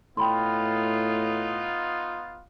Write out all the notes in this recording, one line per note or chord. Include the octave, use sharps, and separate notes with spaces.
A2 B3 D#4 F4 G5 B5 C6